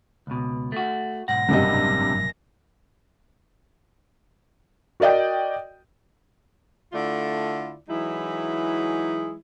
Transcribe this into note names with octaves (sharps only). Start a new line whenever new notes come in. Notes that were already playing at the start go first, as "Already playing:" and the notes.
C#2 B2
A3 F#4
B1 G#2 F#5 A#6
F#1 G2 C3 G3 D#5
F#4 A#4 D5 D#5 G5
D3 A3 E4 F4 D5
E3 F#3 G#3 D#4 E4